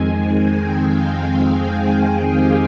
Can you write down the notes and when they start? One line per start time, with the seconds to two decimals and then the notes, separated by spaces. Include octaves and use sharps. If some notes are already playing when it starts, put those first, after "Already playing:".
Already playing: F2 D#3 G#3 C4 G#5
0.60 G5
0.89 F5
1.18 F5
1.47 G#4
2.35 G4